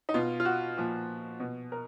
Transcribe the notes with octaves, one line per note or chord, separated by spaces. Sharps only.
D#4
B2 F4
F4
F#4
A#2 F3
B2
A#4